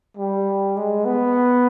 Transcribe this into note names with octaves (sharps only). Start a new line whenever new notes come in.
G3
G#3
B3